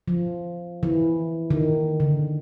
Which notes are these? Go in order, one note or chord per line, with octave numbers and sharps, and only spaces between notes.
F3
E3
D#3
D3